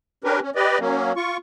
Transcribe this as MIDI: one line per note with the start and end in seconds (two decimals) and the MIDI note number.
0.24 0.40 61
0.24 0.40 62
0.24 0.40 67
0.24 0.40 70
0.24 0.40 71
0.42 0.50 61
0.55 0.78 67
0.55 0.78 71
0.55 0.78 74
0.55 0.78 75
0.80 1.12 54
0.80 1.12 58
0.80 1.12 61
1.16 1.37 65
1.16 1.37 85